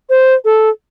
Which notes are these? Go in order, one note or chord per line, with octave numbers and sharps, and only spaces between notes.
C5
A4